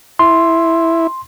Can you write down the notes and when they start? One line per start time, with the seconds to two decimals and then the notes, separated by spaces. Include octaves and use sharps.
0.19 E4 C6